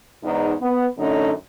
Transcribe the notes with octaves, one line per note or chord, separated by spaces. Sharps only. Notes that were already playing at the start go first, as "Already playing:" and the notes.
E2 G#2 D#4
B3
F#2 D3 A3 C#4 D#4